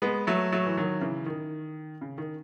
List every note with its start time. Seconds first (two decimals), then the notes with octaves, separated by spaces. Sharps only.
0.02 G#3 B3
0.27 F#3 A3
0.52 F#3 A3
0.66 E3
0.77 D#3 F#3
1.01 C#3 E3
1.26 D#3
2.01 C#3
2.18 D#3